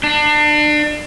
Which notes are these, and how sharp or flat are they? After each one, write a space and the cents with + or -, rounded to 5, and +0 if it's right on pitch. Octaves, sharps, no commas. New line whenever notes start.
D4 +30